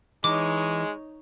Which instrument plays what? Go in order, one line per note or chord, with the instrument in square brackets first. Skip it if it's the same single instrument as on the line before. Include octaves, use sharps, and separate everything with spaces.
[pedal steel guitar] E3 [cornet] G#3 [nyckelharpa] D#4 C#5 [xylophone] D6